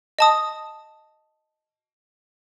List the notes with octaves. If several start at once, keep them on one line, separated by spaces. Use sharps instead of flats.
D#5 A5 D#6